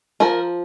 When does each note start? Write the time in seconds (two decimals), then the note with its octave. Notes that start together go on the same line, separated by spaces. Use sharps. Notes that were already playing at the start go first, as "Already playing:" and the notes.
0.20 F3 A#4